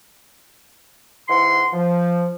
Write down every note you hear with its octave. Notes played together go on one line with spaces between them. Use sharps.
G#2 E3 F#5 C6
F3